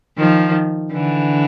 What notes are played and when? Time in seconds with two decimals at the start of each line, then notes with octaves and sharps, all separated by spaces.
0.17 D#3 F3
0.93 D3 E3